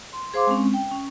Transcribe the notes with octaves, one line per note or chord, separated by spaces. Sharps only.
C6
G#4 C5 F5 C6 D6
G#3 C4 C#4
G5
C#4